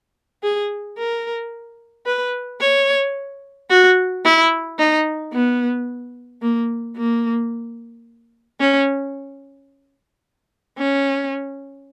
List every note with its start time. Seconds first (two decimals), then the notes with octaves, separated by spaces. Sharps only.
0.43 G#4
0.98 A#4
2.06 B4
2.60 C#5
3.70 F#4
4.25 E4
4.78 D#4
5.33 B3
6.42 A#3
6.96 A#3
8.60 C#4
10.78 C#4